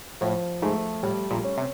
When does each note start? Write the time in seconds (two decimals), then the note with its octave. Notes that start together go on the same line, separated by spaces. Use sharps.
0.21 A2 F3
0.62 G#2 A3
1.03 A2 G3
1.30 A#1 A#2
1.44 C#4
1.58 C3